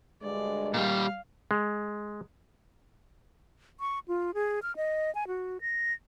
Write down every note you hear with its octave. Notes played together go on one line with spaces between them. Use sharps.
D2 G2 G#3 D5
A#2 G3 F5
G#3
C#6
F4
G#4
F6
D#5
G#5
F#4
A#6